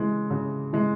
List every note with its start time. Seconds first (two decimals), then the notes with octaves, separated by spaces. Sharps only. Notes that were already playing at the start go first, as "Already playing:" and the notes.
Already playing: C#3 E3 G#3
0.30 C#3
0.73 E3 G#3